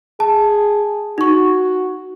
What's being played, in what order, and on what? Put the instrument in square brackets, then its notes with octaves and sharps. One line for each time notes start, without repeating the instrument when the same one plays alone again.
[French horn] G#4 [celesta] A5
[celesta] D#4 C#6 [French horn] F#4